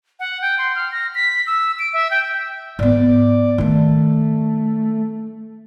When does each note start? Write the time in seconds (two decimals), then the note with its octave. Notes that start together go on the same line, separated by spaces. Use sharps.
0.20 F#5
0.42 G5
0.58 C6
0.75 F6
0.92 A#6
1.15 B6
1.47 E6
1.79 D7
1.93 E5
2.11 G5
2.79 G#2 B3 D5
3.58 D#3 A3 D#4